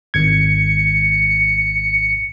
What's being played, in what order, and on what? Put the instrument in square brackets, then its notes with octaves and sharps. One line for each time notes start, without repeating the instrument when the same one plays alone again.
[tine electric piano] G#1 G#6 [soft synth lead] C#7